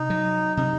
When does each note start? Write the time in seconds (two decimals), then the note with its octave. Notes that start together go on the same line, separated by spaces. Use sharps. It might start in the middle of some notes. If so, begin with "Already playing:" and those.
Already playing: C3 D#4
0.10 F#3
0.56 C3 D#4